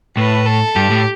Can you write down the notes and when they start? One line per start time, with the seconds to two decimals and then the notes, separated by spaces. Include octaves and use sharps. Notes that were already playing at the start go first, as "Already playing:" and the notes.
0.17 A2 B4
0.46 A4
0.75 G2 G4
0.90 A2